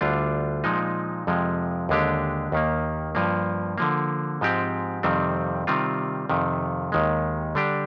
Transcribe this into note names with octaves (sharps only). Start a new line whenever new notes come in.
D2 D3 G3 D4 F4
A#2 F3 G#3 D#4
F2 C3 F3 G#3
D#2 D3 G#3 D4 G4
D#2 D#3 A#3
G2 F3 A#3
D3 F3 A#3
G#2 F3 G#3 C4 G4
F2 C3 D#3 G3 C4
C3 D#3 G3 C4 F4
F2 C3 D#3
D#2 D#3 G#3
D3 G3 D4 G4